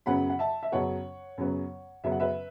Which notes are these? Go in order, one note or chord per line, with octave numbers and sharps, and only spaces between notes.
F#2 C#3 F#3 B3 F#5 B5
F#5
E5 A5
E5
F#2 C#3 F#3 B3 C#5 F#5
F#2 C#3 F#3 B3
F#2 C#3 F#3 B3 E5
F#5
B4 E5